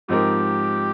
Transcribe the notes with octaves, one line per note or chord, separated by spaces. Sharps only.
G#2 F3 C4 D#4 G4 A#4